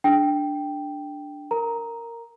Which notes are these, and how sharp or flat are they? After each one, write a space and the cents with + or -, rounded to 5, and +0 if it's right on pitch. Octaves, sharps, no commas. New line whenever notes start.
D4 +0 G#4 +0 G5 +0
A#4 -10 A#5 +0